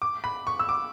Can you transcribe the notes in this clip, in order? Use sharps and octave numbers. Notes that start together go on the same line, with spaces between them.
D6
B5
C#6
E6
D6